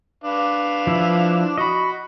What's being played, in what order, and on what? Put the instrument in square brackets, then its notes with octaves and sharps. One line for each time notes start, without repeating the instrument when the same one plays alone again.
[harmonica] D4 B4 F5
[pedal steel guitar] F3 E4 E5
[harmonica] F#4 [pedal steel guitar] D#5 B5